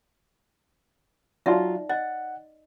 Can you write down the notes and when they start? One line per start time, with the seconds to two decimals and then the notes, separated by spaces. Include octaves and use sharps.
1.46 F#3 D#4 F4 D5 E5
1.89 D#5 F#5